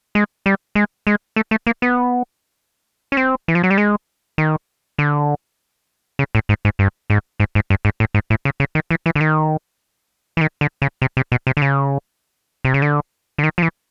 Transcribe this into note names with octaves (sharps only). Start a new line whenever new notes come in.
G#3
G3
G#3
G#3
A3
A3
A#3
B3
C#4
C4
E3
F3
F#3
G3
G#3
D#3
D3
C#3
A2
G#2
G#2
G2
G#2
G#2
G#2
G2
G#2
A2
G#2
A2
C#3
C#3
D#3
E3
E3
D3
D#3
E3
D#3
D3
C#3
C3
C3
B2
C3
D3
C#3
C3
C#3
D3
D3
D#3
F3
E3